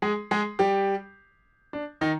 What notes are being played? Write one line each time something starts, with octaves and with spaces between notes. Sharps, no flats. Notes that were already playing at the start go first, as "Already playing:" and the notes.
G#3 G#4
G#3 G#4
G3 G4
D4
D#3 D#4